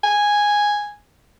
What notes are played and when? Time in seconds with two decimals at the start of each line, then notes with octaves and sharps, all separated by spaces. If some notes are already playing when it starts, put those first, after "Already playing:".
0.04 G#5